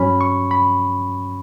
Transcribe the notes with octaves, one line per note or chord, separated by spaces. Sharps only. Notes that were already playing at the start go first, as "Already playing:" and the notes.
Already playing: G2 F#3 C#4 B5
C#6
B5